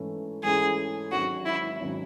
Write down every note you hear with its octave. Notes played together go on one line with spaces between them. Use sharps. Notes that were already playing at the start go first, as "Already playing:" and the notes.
Already playing: G#2 E3 A3 C#4 E4
G#2 E3 A3 C#4 E4 G#4
G#1 G#2 D#3 F#3 C#4 F#4
E4
G#1 D#3 F#3 C#4